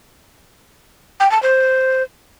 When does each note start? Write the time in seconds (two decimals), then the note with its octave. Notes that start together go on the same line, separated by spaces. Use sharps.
1.20 G5
1.31 A5
1.43 C5